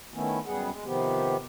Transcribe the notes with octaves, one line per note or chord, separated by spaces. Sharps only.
D#3 A3 B3 C#4 E4
F#2 G3 B3 G#4 F#5
G#3
C3 D#3 F3 B3 G4